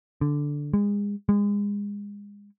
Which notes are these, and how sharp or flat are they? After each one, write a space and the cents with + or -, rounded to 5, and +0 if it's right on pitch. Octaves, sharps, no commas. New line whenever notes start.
D3 -5
G#3 -30
G#3 -30